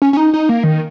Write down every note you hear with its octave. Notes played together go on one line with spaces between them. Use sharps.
C#4
C#4
D#4
D#4
A#3
D#3